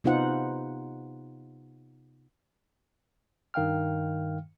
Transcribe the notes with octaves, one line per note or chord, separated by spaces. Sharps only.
C3 B3 D#4 F4 C5 F#5
G2 D#3 F5 G5 F6